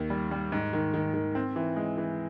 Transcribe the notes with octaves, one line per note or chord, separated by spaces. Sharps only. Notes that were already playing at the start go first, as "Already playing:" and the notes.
Already playing: D#2 D#3
G3
G3
G#2
D#3
D#3
D#3
C4
E3
G#3
E3